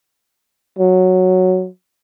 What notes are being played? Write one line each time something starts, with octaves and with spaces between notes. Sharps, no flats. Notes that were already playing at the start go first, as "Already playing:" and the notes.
F#3